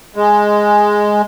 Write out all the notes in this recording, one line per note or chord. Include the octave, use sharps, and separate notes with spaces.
G#3